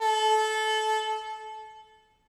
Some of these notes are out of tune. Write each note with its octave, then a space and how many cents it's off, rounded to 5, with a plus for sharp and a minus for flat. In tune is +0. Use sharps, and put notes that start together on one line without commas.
A4 -20